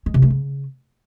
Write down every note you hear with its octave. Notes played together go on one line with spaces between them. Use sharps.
G#3
C3
A3
C#3